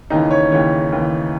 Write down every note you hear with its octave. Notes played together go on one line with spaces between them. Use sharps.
D#2 C#3 E3 D#4
C#5
D#2 C#3 E3 C#5
D#2 C#3 E3